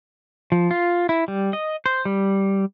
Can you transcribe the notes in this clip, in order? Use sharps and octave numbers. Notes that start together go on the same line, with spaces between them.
F3
F4
E4
G3
D#5
C5
G3